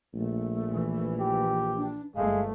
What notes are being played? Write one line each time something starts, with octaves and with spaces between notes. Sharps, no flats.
A#1 A3
E3
G4
D4
G1 G#3 A3 F5